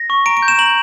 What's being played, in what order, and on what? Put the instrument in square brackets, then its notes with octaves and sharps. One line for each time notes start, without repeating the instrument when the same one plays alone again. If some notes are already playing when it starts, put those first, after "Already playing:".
Already playing: [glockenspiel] A#6
C#6
A#5 D7
D7
G6
E7
A#5 F#7